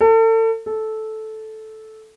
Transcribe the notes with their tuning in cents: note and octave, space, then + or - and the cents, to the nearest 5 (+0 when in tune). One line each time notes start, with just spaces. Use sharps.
A4 +35
A4 -10